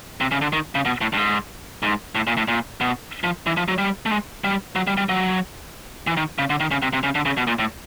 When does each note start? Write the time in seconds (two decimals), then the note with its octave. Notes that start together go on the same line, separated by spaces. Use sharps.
0.21 C3
0.32 C#3
0.41 D3
0.53 D#3
0.75 C#3
0.85 B2
1.01 A2
1.13 G2
1.17 G#2
1.82 G#2
2.15 A2
2.27 A#2
2.37 A2
2.48 A#2
2.81 B2
3.24 F3
3.46 E3
3.57 F3
3.68 F#3
3.78 G3
4.06 A3
4.11 G#3
4.44 G3
4.76 F#3
4.87 G3
4.97 G3
5.09 F#3
6.07 E3
6.17 D#3
6.38 C#3
6.50 D3
6.60 D#3
6.71 C#3
6.82 C3
6.93 C3
7.03 C#3
7.15 D3
7.26 C#3
7.37 B2
7.47 A#2
7.59 A2